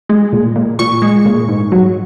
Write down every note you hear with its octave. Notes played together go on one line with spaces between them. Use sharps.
G#3
A#2
A#2
A#2 C#6
G#3
A#2
G#2
F#3